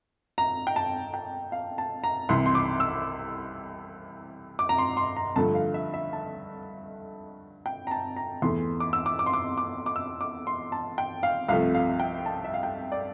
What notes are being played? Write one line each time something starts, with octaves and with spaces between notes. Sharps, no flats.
A#5
G5
A5
G5
F5
A5
A#5
C2 C3 E3 C6
C6
D6
E6
D6
A#5
C6
C6
A#5
G2 D3 F3 A3 A5
F5
E5
E5
A5
G5
A#5
A5
A#5
E2 E3 A3 C6
D6
E6
D6
D6
C6
D6
D6
D6
E6
D6
C6
A5
G5
F5
C2 C3 F3 A3 F5
F5
G5
A5
E5
F5
G5
D5